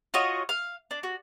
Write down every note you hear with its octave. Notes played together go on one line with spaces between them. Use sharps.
F4 F#4 C#5 D#5
F5
D4
F#4